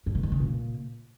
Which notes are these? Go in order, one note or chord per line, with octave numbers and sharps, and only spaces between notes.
G2
B2
D#3
C#3
A#2